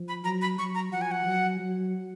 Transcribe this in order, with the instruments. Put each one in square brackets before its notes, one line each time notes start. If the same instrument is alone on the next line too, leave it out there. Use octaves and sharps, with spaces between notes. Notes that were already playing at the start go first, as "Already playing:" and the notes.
Already playing: [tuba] F3
[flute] B5
[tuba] F#3 [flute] A#5
[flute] B5
[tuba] F#3 [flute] C#6
[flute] A#5
[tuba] F3 [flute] F#5
[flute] G#5
F#5
[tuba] F#3
F#3